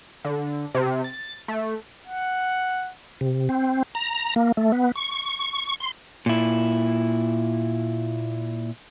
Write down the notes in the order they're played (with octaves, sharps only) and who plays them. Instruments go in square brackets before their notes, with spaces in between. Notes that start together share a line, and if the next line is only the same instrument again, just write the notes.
[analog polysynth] D3
C3
A6
A3
[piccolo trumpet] F#5
[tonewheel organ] C3
C4
A#5
A#3
A3
B3
C#6
C6
[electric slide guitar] A#2 E4